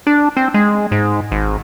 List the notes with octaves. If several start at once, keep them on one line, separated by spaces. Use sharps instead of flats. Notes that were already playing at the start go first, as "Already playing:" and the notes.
D4
C4
G#3
G#2
G#1